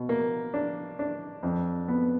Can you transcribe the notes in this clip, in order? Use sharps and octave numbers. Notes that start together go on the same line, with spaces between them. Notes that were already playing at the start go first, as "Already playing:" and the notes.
Already playing: B2
A#3
D4
D4
F2
B3